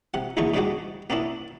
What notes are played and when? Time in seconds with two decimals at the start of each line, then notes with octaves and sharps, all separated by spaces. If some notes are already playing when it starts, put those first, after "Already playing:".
0.14 C3 F#5
0.37 A#1 E2 D3 A3 D#4 C#6
0.54 G#2 C#3 G3 G#3 D4 F#4
1.10 A#3 B3 C#4 D4 E4